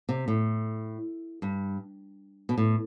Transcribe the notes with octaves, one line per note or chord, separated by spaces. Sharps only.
C3
A2
G2
B2
A2